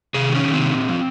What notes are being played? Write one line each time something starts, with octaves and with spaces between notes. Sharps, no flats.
C3 G#4
D#3
C#4
D#3
C4
C3
A#2
F3